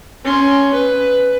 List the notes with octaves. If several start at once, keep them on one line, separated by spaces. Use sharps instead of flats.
C#4 C6
B4